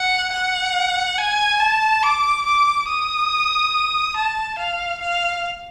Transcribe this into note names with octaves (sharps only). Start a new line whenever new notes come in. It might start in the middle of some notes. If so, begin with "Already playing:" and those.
Already playing: F#5
F#5
G#5
A5
D6
D6
D#6
A5
F5
F5